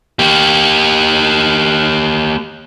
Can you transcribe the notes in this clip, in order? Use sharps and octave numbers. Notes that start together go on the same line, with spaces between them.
A#3 G4